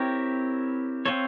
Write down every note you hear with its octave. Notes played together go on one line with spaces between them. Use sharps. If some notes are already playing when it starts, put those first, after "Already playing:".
Already playing: C4 E4 G4 A#4 C#5
C4 F4 A4 C#5